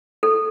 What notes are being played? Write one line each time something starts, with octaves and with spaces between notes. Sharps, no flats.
A4